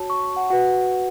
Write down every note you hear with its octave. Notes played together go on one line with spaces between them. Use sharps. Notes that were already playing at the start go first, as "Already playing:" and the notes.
Already playing: F#4 C#5 A5
C#6
F#5
F#4 B4 F#5